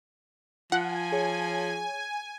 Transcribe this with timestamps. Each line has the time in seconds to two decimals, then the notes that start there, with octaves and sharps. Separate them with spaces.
0.72 F3 F4 F#5 G#5
1.12 G#4 C#5